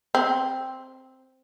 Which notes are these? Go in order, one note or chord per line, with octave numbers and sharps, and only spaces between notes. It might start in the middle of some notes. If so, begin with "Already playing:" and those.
C4